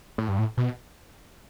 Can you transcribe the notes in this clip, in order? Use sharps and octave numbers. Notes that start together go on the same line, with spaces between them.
A2
G2
A2
B2